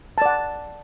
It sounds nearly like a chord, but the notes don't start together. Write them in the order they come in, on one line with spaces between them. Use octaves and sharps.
A5 D5 F#5